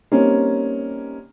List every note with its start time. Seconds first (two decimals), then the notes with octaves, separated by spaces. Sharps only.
0.11 G3 A#3 C4 C#4 D#4